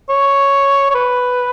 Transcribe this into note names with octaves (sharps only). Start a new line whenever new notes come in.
C#5
C#5
B4